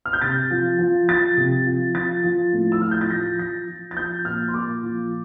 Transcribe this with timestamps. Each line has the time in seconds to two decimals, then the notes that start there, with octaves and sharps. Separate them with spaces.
0.05 F6
0.13 G6
0.22 C3 A6
0.51 F3
0.79 F3
1.08 F3 A6
1.37 C3
1.66 F3
1.94 F3 A6
2.24 F3
2.53 A2
2.72 E6
2.81 F3 F6
2.91 G6
3.01 A6
3.10 F3 A#6
3.39 F3 A#6
3.68 F3
3.91 A6
3.97 F3 G6
4.25 A#2 F6
4.48 C6
4.54 A#2 D6
4.83 F3